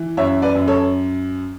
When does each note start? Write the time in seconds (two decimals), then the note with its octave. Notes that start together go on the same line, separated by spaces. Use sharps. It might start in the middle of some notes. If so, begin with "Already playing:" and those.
Already playing: E3
0.17 F#2 C#5 E5
0.42 B4 D5
0.55 F#2
0.68 A4 C#5